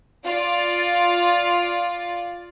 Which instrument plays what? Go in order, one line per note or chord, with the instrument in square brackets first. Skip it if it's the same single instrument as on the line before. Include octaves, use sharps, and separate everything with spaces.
[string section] F4 D5